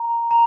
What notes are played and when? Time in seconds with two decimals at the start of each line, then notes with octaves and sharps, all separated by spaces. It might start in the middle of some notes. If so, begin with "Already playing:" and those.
Already playing: A#5
0.31 A#5